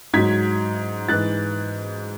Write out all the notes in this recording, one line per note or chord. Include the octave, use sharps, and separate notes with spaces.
G#2 F#3 G#6 B6
G#2 E3 F#6 A6